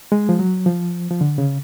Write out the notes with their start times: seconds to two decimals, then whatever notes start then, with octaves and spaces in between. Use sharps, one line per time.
0.12 G#3
0.29 F3
0.39 F#3
0.66 F3
1.11 F3
1.21 D3
1.38 C#3